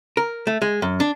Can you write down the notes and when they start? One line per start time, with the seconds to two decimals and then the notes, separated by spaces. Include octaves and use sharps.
0.17 A#4
0.47 A3
0.62 G#3
0.82 F#2
1.00 D4